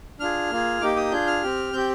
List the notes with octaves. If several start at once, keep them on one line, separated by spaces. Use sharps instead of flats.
D4 F4 G#4 F6
A#3 F4 G#4
A#3 D#4 G4 D6
D#6
D4 F4 G#4 G6
F6
C4 G4
C4 G4 G6